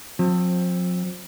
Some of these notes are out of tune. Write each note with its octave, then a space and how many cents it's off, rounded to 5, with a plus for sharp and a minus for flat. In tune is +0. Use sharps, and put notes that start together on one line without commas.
F3 +45 C4 +20